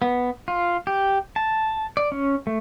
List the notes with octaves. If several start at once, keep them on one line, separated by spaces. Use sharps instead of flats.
B3
F4
G4
A5
D5
C#4
A3